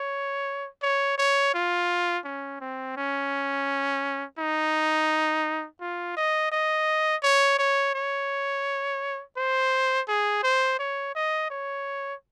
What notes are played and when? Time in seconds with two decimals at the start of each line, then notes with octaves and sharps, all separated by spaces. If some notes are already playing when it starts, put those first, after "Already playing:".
Already playing: C#5
0.83 C#5
1.18 C#5
1.54 F4
2.25 C#4
2.61 C4
2.97 C#4
4.39 D#4
5.81 F4
6.17 D#5
6.52 D#5
7.23 C#5
7.59 C#5
7.94 C#5
9.37 C5
10.08 G#4
10.43 C5
10.79 C#5
11.15 D#5
11.50 C#5